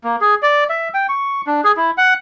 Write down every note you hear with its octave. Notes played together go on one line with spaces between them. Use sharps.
A#3
G#4
D5
E5
G5
C#6
D4
G#4
E4
F#5